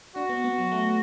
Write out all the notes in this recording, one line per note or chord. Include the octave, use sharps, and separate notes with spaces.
D4 F#4
B3
B3
F#3
A3